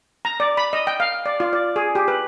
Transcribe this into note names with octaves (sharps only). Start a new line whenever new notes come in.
A#5
D5
B5
D#5
G5
F5
D5
F4
D5
G#4
G4
B4